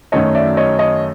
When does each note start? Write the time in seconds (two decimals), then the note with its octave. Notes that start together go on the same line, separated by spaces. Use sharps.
0.12 F#2 D#3 F#3 A3 C#5 D#5
0.35 D5 E5
0.57 C#5 D#5
0.79 C#5 D#5